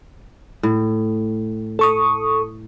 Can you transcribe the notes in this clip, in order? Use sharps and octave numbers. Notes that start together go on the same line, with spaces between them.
A2
A4 C#6 D#6